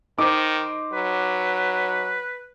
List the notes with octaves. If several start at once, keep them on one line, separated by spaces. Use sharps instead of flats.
D#3 D#4 C5 D6
F#3 B4